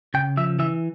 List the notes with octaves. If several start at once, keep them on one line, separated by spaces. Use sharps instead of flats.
C#3 G5
F3 E5
E3 E5